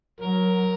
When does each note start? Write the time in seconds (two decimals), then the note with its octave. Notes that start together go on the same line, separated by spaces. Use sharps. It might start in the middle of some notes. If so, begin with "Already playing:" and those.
0.20 F#3 A#4